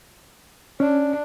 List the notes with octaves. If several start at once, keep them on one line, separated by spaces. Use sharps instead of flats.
C#4 D4